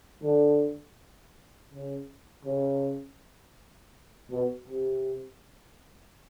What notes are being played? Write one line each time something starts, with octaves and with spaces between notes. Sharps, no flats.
D3
C#3
C#3
B2
C3